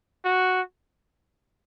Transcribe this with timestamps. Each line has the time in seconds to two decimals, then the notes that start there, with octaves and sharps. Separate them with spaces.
0.25 F#4